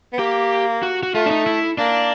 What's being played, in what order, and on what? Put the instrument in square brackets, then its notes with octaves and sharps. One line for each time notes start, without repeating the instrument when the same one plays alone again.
[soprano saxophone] B3
[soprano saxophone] A#3 [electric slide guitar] G4
[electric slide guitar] F#4
F#4
[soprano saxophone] A3 [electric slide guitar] F4
[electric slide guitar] D4
D#4
E4
[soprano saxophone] A#3 [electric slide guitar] D4